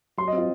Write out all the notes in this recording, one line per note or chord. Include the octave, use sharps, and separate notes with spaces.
F#3 C6
D#5
C4
F4